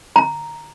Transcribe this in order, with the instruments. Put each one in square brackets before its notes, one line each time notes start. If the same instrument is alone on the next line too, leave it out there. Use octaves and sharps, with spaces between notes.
[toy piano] A#5